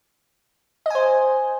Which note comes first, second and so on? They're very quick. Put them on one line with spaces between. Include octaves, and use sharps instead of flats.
D#5 G#5 C5